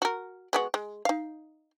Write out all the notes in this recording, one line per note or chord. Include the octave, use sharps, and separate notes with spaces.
F#4 A#4
G#3 B3 F#4
G#3
D#4 F5